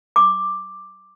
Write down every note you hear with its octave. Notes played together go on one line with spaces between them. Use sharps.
D6